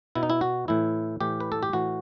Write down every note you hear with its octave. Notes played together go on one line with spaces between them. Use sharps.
B2 E4
D#4
E4
F#4
A2 E3 E4
A2 E3 G4
B4
A4
G4
A2 E3 F#4